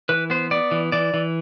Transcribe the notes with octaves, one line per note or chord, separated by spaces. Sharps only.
E3 B4
B3 C5
B3 D5
E3
E3 D5
E3